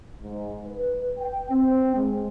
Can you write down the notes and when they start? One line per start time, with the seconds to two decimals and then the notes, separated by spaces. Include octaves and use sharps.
0.23 G#2
0.67 B4
1.19 G5
1.51 C4
1.95 G#3